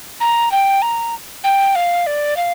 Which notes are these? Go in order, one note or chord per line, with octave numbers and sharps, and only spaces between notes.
A#5
G5
A#5
G5
F5
D5
F5